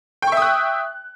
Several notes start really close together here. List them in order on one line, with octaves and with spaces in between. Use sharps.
G5 C#6 E5 D#6 F#6